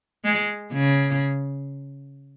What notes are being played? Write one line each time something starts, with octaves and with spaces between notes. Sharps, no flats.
G#3
C#3